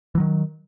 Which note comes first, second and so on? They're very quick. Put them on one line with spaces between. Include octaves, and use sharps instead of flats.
E3 F#3 D#3